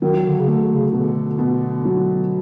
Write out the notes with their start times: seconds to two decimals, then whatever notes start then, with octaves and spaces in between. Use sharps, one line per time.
0.01 D#3 F#3
0.25 D3
0.39 C#3
0.47 D3 A3
0.71 C#3
0.93 B2 D3
1.39 B2
1.85 F#3